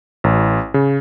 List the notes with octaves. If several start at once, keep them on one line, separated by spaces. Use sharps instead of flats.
A1
C#3